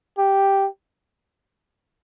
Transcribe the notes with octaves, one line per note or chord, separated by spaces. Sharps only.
G4